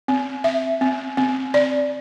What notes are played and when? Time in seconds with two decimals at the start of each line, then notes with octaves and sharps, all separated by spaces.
0.08 C4
0.44 E5
0.81 C4
1.17 C4
1.54 D5